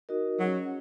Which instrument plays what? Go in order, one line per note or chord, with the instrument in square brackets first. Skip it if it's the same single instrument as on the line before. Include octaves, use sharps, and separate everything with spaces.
[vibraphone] D#4 F#4 A#4 D#5
[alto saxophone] F#3 [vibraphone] C#4 G#4 F#5